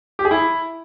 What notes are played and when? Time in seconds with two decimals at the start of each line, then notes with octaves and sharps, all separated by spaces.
0.19 G4
0.25 G#4
0.31 E4